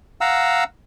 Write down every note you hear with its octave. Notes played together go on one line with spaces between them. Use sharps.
F5 F#5 A#5 E6